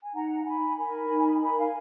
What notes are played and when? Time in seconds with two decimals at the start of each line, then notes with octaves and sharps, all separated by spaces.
0.03 G#5
0.14 D#4 F#5 A#5
0.46 D#4 G#5 B5
0.78 A#4 G#5 B5
1.10 D#4
1.41 A#4 G#5 B5
1.58 F5 G#5